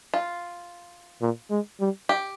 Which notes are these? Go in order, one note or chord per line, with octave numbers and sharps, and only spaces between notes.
F4
A#2
G#3
G3
G4